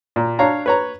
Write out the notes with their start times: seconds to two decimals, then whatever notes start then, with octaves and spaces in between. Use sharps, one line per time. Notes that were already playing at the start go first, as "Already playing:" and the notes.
0.16 A#2
0.39 D4 C#5 F5 A#5
0.66 B4 C#5 A#5